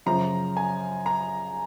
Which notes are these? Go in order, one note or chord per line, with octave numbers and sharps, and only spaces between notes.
F#2 C#3 F3 A#5
G#5
A#5